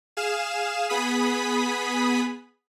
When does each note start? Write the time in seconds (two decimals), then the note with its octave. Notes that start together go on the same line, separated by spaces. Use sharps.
0.17 G#4 F5 E7
0.89 B3 G#4 B5 D#6 B6